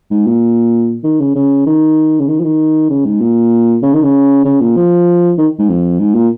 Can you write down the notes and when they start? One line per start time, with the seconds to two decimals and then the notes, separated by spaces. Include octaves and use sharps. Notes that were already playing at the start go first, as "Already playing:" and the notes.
0.11 G#2
0.27 A#2
1.04 D#3
1.20 C#3
1.35 C#3
1.66 D#3
2.20 C#3
2.28 D#3
2.40 F3
2.44 D#3
2.90 C#3
3.05 G#2
3.21 A#2
3.82 C#3
3.94 D#3
4.03 C#3
4.45 C#3
4.60 A#2
4.76 F3
5.38 D#3
5.59 G#2
5.69 F2
5.99 G#2
6.15 A#2